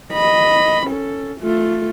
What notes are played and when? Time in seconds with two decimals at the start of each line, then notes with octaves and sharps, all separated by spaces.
0.13 D#5 B5
0.87 C#4 A4
1.40 A3 F4